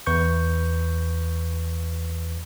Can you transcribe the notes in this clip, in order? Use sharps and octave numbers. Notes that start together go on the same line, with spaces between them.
E2 B4 C#6 G6